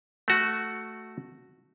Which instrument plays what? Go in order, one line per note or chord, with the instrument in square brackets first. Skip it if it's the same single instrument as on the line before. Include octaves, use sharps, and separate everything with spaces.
[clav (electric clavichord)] A3 F#4